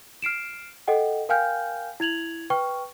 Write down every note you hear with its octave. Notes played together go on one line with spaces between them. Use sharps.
F6 C7 D7 E7
A4 D#5 F#5 G5
A#4 F5 G5 G#5 F6 G6
E4 G#6 F7 F#7
B4 G5 C#6 F6